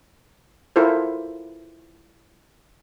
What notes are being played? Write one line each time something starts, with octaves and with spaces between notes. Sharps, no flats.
E4 F4 A4 A#4 C5